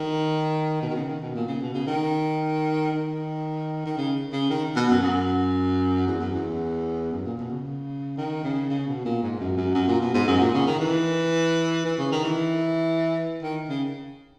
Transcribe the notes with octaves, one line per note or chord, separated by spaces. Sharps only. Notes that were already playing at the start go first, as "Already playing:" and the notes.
Already playing: D#3
B2
D#3
C#3
D#3
B2
A#2
C#3
B2
C#3
D#3
D#3
D#3
C#3
C#3
D#3
B2
F#2
F#2
E2
F#2
E2
F#2
A#2
B2
C#3
D#3
C#3
C#3
B2
A#2
G#2
F#2
F#2
F#2
A#2
B2
G#2
F#2
A#2
C#3
D#3
E3
E3
C#3
D#3
E3
D#3
C#3